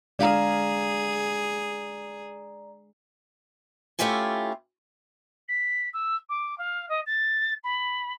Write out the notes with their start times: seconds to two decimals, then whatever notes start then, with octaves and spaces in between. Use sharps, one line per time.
0.19 G#3 D4 G#4 D5 F5 A#5
3.99 A3 C#4 E4 F4 G4 G#5
5.48 B6
5.93 E6
6.29 D6
6.58 F5
6.88 D#5
7.06 A6
7.63 B5